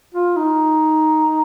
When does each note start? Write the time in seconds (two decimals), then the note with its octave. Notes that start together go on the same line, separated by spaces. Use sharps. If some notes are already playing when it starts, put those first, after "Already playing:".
0.14 F4
0.36 D#4